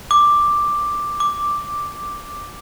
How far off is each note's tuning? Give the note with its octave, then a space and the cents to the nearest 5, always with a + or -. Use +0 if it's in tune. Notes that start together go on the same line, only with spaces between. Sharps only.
D6 +5
D6 +0